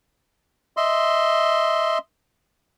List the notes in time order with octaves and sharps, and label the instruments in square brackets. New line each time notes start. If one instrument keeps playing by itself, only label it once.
[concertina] D#5 E5 C6